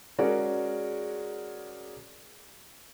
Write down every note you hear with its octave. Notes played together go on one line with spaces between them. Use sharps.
G#3 C#4 F#4 G#4 A#4 D5